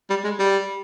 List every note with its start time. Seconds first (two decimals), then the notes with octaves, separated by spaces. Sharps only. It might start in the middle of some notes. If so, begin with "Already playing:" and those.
0.10 G3
0.24 G#3
0.39 G3